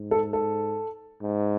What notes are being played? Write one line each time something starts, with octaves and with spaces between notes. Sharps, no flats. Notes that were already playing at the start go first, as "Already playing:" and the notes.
Already playing: G#2
A4
A4
G#2